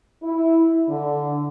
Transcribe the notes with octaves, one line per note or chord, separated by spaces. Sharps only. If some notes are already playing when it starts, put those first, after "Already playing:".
E4
D3